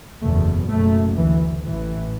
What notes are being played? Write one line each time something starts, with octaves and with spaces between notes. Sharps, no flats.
F#1 E2 B2 A3
F#1 F#2 A3
D2 E3
A1 A2 E3